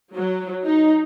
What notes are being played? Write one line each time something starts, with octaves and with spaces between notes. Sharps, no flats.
F#3
D#4